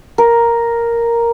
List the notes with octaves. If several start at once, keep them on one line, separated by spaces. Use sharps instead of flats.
A#4